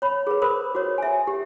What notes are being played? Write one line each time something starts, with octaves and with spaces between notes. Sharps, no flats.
C#5 B5
G#4 B4
A#4 C5 B5 D#6
F#4 C#5
E5 G#5
G4